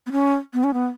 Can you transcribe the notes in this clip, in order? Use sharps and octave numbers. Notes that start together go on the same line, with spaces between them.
B3
C#4
B3
C#4
B3